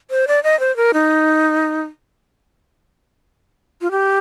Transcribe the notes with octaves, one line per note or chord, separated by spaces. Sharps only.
C5
D5
D#5
C5
A#4
D#4
F4
G4